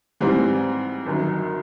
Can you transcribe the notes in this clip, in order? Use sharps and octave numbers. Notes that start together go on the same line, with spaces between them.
G#2 E3 G3 C4
G1 F#2 D#3